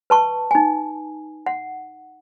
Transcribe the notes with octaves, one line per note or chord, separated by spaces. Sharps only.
B4 A5 C#6
D#4 G#5
F#5